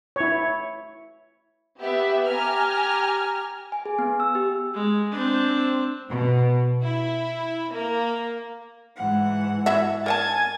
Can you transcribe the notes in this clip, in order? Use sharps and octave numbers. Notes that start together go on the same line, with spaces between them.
E4 C#5
B3 G4 E5
G4 G#5 A#5 F6
G#5
G#4
B3
E6
G4
G#3
C4 D4
B2
E4
A#3
G#2 E3 F#5
E4 F#4 E5
A#4 F#5 G#5 A5 G#6 A6